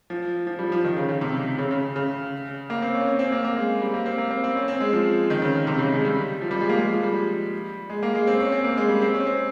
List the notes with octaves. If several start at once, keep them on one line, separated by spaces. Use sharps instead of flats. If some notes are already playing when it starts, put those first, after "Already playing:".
F3
F3
G3
F3
D#3
C#3
C#3
C3
C#3
C#3
C#3
A#3
C4
C#4
C#4
C4
A#3
A#3
G#3
G3
A#3
C4
A#3
C4
C4
C#4
C4
G#3
F3
D#3
C#3
C#3
C3
C#3
G#3
G3
F3
G3
G#3
A#3
G#3
F3
G3
G#3
A#3
G#3
C4
C#4
C4
A#3
G#3
G3
C4
C#4
C4